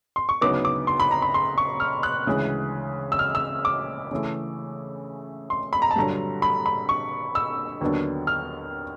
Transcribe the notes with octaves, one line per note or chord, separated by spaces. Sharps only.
C6
C#6
D2 C#3 F#3 B3 D#4 D6
D6
C6
B5
A#5
B5
C6
C#6
F6
F#6
D2 C#3 E3 G#3
E6
F6
E6
D6
C#3 E3 A3
C6
B5
A#5
A5
G2 D3 F#3 A#5
B5
B5
C#6
E6
D#2 D3 F#3 B3 D4
F6